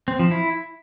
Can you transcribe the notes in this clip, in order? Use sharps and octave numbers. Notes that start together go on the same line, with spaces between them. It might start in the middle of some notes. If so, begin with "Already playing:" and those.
C4
F3
E4